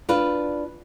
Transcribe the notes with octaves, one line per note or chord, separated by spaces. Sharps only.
D4 F4 B4